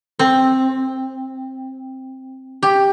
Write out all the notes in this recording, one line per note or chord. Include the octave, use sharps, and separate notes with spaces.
C4
G4